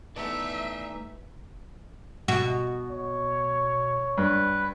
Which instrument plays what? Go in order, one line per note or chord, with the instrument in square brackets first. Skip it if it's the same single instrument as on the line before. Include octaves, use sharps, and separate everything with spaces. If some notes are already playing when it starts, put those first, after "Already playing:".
[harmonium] E3 D#4 [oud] A3 B3 [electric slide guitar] D5 A5 A#5 [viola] E5
[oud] B2 F#4
[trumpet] C#5
[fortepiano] G2 [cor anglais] B4